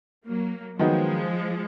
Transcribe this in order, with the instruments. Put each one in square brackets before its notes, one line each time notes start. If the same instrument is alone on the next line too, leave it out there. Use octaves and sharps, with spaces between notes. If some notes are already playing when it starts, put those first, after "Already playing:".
[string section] F#3 A#3
[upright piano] D#3 F#3 B3 D#4 [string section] F3 G#3